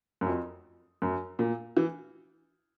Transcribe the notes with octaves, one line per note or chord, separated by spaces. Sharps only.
F#2
F2
F#2
A#2
E3